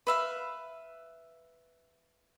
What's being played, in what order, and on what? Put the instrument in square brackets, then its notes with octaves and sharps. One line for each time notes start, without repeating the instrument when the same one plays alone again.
[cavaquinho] B4 E5 F5